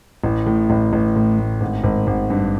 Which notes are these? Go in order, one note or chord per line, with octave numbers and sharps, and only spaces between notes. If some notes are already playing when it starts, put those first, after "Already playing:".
A1
A2
A1
A1
A2
A2
G#1
G#1
G#1
G2